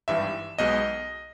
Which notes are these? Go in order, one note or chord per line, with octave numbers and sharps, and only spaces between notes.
G#1 G2 E3 G3 E5
B1 B2 G#3 D#5